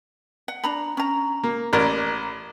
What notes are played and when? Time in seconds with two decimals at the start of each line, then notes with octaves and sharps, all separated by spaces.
0.48 F#5
0.64 D4 A#5 B5
0.97 C#4 A#5
1.43 A#3
1.73 A1 A#4 C#5 D5